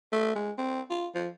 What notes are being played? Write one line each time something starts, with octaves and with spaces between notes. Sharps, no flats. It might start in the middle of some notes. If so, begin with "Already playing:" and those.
A3
G#3
C4
F4
F3